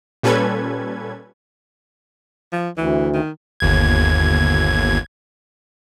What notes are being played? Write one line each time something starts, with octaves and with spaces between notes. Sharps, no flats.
A#2 G3 C#4 A4 B4 G#6
F3
D2 E3
D#3
G1 D#2 G#6